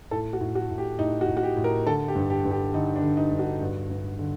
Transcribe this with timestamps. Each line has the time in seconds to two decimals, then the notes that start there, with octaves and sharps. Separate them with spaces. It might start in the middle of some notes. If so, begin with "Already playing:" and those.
0.11 A2 A4
0.33 F#4
0.41 A2
0.55 F#4
0.70 A2
0.78 G4
0.99 A2 D#4
1.21 F#4
1.28 A2
1.37 F#4
1.43 G4
1.57 A2
1.64 A#4
1.86 D3 A4
2.08 G4
2.15 G2
2.30 G4
2.45 G2
2.51 G4
2.73 D3 D#4
2.96 D4
3.03 D3
3.17 D#4
3.32 G2
3.39 F#4
3.61 G2
3.90 G2
4.19 D3